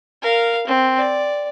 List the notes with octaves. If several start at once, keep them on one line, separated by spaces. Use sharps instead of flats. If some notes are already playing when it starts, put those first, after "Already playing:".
A#4 F5
C4
D5